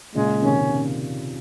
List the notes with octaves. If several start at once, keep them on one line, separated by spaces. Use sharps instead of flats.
A#2 C#3 G#3
C3 D#3 C#4